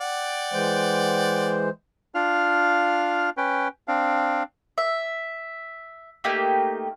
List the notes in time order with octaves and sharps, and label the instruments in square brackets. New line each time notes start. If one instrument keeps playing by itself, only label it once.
[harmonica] D5 F#5 G5
[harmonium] E3 G#3 C5
[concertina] D4 F4 F5 F6
C#4 B4 G5
C4 D4 F5
[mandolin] E5
A3 A#3 D#4 G4